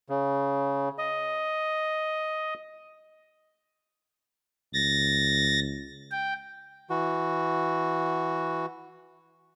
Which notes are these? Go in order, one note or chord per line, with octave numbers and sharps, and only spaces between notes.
C#3
D#5
C#2 A6 A#6
G5
E3 F#4